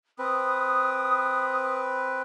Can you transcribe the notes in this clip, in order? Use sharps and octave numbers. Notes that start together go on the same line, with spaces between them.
C4 B4 D#6